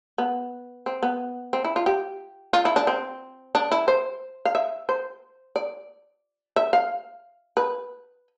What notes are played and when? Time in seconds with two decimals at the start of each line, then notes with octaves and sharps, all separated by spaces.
0.18 B3
0.86 C4
1.03 B3
1.53 C4
1.65 E4
1.76 F4
1.86 G4
2.53 F4
2.65 E4
2.76 D4
2.87 C4
3.55 D4
3.72 E4
3.88 C5
4.45 F5
4.55 E5
4.89 C5
5.56 D5
6.56 E5
6.73 F5
7.57 B4